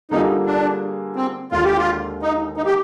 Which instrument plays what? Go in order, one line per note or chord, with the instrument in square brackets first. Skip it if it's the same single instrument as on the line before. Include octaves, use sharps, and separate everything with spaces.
[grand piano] D3 G3 A#3 F4 G#4 [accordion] D#4
[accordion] D4
C4
[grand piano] D#2 D3 G#3 D4 [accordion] F4
[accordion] G4
F4
D#4
D#4
G4